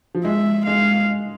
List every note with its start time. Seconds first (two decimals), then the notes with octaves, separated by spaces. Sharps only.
0.15 F3
0.24 G#3 E5
0.66 G#3 F5